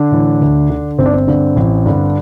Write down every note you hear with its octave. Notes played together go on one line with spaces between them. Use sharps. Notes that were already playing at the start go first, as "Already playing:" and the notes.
Already playing: D3 D4
A2 E3
D2
D3
G1 C4
D4
C4
G2 D3
A1
G2 D3